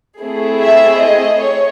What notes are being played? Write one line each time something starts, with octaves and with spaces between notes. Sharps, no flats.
A3 C4 E4 G#4
E5
D#5
C#5